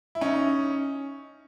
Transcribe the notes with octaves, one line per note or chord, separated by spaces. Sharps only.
E4
C#4 D#4